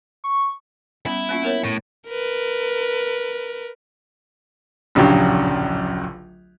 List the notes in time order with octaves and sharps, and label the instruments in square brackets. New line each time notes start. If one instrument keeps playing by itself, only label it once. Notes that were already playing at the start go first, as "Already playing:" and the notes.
[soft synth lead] C#6
[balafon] G3 B3 C#4 [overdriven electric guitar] E4
[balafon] A#3 C#4 F4
B3 A#4 C#5
[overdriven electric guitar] A2
[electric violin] A#4 B4
[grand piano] D1 A#1 C#3 F#3 D4 G4